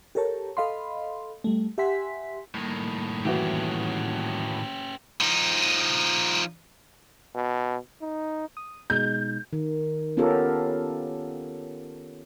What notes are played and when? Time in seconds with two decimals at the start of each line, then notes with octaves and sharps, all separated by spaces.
0.15 G4 A4 A#4 C#5 A5
0.57 A4 D#5 F5 B5 C6
1.44 G3 A3
1.78 G4 E5 F#5 G#5 C6 B6
2.54 A2 D#3 G3 A#3
3.25 E3 C#4 F#4 G4 B4
5.21 F3 D#4
7.35 B2
8.02 D#4
8.57 D#6
8.90 B2 G#3 D#4 G6
9.53 D#3
10.17 B3 C#4 F4 G4 A4 A#4